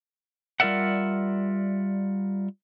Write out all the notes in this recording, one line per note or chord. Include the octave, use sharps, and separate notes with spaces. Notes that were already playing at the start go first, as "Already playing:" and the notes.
G3 F4 A#4 D5 E5 F#5